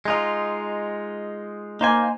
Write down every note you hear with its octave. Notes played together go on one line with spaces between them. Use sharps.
G#3 D#4 F4
A#3 D#4 C5 G#5